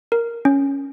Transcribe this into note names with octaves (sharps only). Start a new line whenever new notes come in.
A#4
C#4